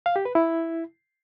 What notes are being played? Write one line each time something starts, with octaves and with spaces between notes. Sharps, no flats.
F5
G4
B4
E4